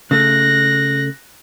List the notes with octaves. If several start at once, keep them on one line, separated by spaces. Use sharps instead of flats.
C#3 A3 F#6 A#6